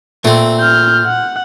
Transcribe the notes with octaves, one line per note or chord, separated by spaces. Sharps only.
A#2 A3 C4
F6 G6
F#5